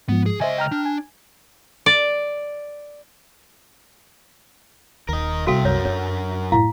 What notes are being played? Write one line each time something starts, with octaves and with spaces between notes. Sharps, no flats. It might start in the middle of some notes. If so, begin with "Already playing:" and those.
G#2 F3 B3
G#4
C#2 C5 D#5 E5 G#5
G5 A#5 F6
D4
G#5
D5
D#1 D#2 A#4 D#5
C2 F#4 A4 E5 F5 G5
F#2 F#3 A#4 C#5
D4 C#5
A2 E4 F5